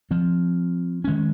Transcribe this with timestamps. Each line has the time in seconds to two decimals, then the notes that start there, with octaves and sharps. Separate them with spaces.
0.11 F3 C4
1.04 D#3 G#3 C#4